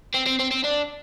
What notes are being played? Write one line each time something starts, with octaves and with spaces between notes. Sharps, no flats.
C4
C4
C4
C4
D4